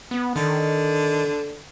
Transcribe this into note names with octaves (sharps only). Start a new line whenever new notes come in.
B3
D3 D#3